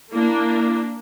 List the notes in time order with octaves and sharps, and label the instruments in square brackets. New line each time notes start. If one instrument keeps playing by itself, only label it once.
[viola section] A#3 D4 [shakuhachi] E4